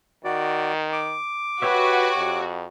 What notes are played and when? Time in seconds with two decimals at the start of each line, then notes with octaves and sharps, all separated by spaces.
0.24 D#3 F#4 D5
0.93 D6
1.62 F#4 G4 B4 C#5 E5
2.17 F2